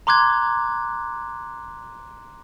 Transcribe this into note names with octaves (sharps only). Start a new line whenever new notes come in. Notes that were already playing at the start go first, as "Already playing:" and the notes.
A#5 C6 D6 F#6 G#6